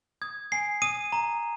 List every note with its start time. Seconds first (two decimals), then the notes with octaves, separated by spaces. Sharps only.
0.22 D#6 G#6
0.52 G#5 C7
0.82 D#6 D#7
1.12 A#5